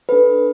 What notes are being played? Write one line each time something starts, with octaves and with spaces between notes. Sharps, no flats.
D4 A4 B4